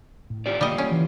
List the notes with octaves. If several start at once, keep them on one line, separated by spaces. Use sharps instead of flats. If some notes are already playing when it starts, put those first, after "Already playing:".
A2
F4 G4 D5
C#3 G3 A#3 D#5
C#4
E3